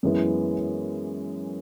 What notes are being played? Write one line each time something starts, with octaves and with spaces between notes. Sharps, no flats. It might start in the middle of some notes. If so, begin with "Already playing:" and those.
F#2 E3 G#3 B3 E4